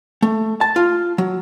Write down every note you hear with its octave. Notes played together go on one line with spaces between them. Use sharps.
A3
A5
F4
F#3